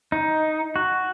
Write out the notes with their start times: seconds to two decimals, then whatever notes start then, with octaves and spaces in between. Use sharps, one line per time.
0.12 D#4
0.76 F#4